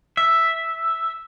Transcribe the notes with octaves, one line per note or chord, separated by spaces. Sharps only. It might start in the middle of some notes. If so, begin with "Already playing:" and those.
E5